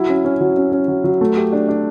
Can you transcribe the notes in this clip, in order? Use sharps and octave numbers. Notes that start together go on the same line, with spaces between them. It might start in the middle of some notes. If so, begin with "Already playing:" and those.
Already playing: F#3 E4
C#4
C#4
F#3
C#4
C#4
F#3
F#3
A3
G4
D4
D4